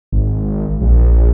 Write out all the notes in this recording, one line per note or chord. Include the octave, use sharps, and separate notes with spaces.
G#1
A#1